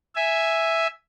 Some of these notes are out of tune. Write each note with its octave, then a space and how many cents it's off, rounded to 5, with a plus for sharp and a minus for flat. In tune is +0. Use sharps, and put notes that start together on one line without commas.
E5 +0 G#5 +0